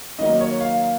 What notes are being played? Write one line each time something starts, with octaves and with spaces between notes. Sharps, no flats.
D#3 F#3 A#3 D#5
C#5
F5